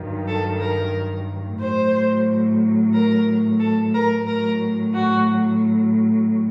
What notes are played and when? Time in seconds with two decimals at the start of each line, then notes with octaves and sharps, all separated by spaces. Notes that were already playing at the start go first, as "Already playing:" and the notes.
Already playing: G2 D#3 F#3
0.27 A4
0.59 A#4
1.59 A2 F#3 C5
2.94 A#4
3.59 A4
3.94 A#4
4.26 A2 F#3 A#4
4.93 F#4